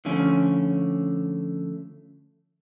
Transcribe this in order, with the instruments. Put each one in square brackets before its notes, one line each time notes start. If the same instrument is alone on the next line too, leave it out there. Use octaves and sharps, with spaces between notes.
[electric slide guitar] D3 F3 A3 C#4